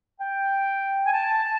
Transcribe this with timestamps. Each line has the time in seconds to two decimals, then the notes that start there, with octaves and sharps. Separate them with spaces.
0.21 G5
1.04 G#5
1.13 A5